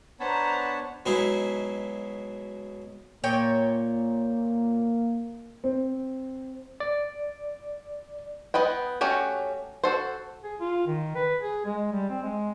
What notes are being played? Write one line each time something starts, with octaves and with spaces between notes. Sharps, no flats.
B3 D4 C5 C#5 A5 A#5
B2 F#3 G#3 D#4 E4 G#4
A#2 A#3 C#5 G5
C4
D5
B3 B4 D#5 G5
A3 C#4 F#4 G4
F#4 A4 C5
G#4
F4
D#3
B4
G#4
G#3
G3
C4
G#3